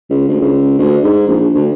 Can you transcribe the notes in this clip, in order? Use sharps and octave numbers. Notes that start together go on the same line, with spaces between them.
C#2
D2
C#2
D2
G#2
A#1
D2